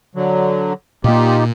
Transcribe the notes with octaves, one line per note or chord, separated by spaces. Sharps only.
D3 F#3
A#2 A#3 D#4 F4 G4